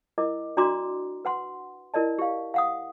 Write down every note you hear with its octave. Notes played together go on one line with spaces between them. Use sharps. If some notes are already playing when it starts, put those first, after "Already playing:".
E4 A#4 D#5 D6
D4 F#4 D5 A#5 C6 D6
B4 F#5 C6
E4 A#4 D5 D#5 A5
G4 F5
F5 F#5 D#6